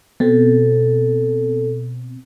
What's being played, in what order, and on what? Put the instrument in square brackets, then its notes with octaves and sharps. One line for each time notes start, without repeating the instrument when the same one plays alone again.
[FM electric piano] B2 C4 [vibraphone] A4